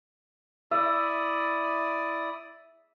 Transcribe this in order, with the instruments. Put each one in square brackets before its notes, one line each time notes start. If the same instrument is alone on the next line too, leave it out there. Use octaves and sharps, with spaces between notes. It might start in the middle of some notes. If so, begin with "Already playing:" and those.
[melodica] E4 D5 D#6 [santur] E5